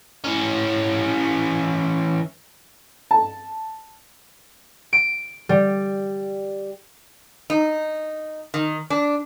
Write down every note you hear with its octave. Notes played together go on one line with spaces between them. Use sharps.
E3 C#4
A5
D7
G3
D#4
D#3
D4